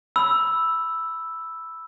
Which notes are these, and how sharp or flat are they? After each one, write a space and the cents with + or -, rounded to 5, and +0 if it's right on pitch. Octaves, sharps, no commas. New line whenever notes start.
B5 +0 E6 +0